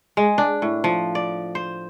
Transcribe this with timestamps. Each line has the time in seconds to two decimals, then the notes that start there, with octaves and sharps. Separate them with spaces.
0.17 G#3
0.38 D4
0.62 A2
0.84 F3
1.15 D5
1.55 C5